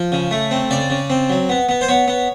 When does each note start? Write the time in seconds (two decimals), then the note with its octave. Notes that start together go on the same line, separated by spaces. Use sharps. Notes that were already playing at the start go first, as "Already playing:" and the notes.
Already playing: F3
0.12 C#3
0.31 A3
0.51 C4
0.70 C#3 D5
0.90 C#3
1.10 C4
1.29 F#3
1.49 B3
1.69 B3
1.81 C5
1.89 B3 C#5
2.08 B3